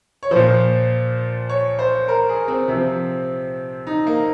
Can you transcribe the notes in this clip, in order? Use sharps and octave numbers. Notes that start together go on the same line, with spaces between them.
C#5
A#2 F3 C5
C#5
C5
A#4
G#4
C4
C3 F3
D#4
A#3